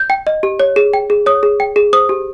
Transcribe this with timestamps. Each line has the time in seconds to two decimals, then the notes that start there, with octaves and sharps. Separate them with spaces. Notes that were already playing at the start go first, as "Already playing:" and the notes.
Already playing: G6
0.10 G5
0.27 D#5
0.43 G4
0.60 C#5
0.76 G#4
0.93 G5
1.10 G#4
1.26 C#5 D#6
1.43 G#4
1.60 G5
1.76 G#4
1.93 C5 D#6
2.09 G4